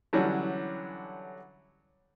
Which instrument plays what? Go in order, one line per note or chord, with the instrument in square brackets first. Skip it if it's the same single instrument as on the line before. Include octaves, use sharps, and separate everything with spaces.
[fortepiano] D3 E3 F#3 G3 C#4 D4